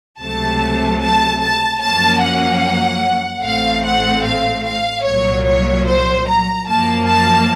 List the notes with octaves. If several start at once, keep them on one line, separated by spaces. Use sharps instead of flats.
C#2 C3 F#3 A3 A5
A5
A5
F#2 F3 A#3 C#4 A5
F#5
A1 A2 A3 C4 F5
F#5
F5
F5
C2 A#2 F#3 C#5
C#5
C5
A#5
F#2 F3 A#3 A5
A5